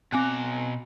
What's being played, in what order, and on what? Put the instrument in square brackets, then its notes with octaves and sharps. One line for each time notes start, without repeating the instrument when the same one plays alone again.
[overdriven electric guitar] B2 A#5 [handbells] C4 G#5 F#6